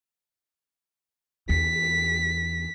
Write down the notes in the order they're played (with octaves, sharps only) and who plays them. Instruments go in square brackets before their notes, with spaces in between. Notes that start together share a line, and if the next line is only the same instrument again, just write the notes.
[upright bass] E2 [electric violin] B6